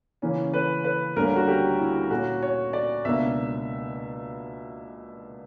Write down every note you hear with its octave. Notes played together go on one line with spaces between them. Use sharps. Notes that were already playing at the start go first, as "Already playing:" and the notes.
C#3 E3 A#3 C#4
B4
B4
D2 D3 G3 A#3 C#4 A#4
F#4
G4
E4
A#2 A#3 C#4 F#4
C#5
D5
C#2 B2 A#3 D4 E5